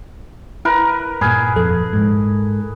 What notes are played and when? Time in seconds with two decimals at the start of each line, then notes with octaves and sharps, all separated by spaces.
0.65 E4 A#4 B4
1.21 G2 A#2 G#4 B5 F6
1.56 F2 A4
1.93 G#2